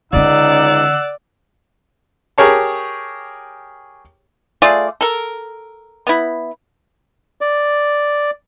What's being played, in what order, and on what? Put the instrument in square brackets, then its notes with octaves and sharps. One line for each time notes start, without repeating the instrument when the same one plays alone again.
[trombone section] C#2 D#4 [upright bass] D3 C#4 [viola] D5 [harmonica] F#5 E6
[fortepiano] G4 G#4 A#4 C#5 A5
[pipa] A3 F4 G#4 D5
A4 A#4
B3 E4
[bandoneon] D5